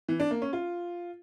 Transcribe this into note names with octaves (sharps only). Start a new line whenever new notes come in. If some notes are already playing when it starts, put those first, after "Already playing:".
E3
D4
A#3
C#4
F4